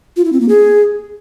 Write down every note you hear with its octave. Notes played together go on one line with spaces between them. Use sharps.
F4
E4
C4
A#3
G#4